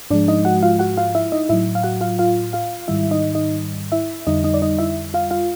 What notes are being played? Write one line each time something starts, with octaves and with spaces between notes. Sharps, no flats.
G#2 F3 G#3 D4 D5
D#4 D#5
F#4 F#5
F4 F5
F#4 F#5
F4 F5
E4 E5
D#4 D#5
A2 F#3 E4 E5
F5
F#4 F#5
F4 F5
F4 F5
F4 F5
G#2 D#3 G3 E4 E5
D#4 D#5
D#4 D#5
E4 E5
F2 D3 G3 D#4 D#5
D#4 D#5
D5
D#4 D#5
E4 E5
F4 F5
F4 F5